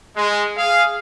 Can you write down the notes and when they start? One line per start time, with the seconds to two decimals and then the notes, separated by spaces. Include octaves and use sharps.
0.16 G#3
0.56 G#4 F5